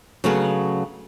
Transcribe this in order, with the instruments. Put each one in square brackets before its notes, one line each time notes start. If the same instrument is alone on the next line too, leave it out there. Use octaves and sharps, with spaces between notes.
[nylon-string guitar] C#3 F#3 A3 B3 F5